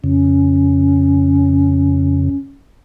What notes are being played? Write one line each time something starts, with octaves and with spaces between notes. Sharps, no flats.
F2 C#3 C#4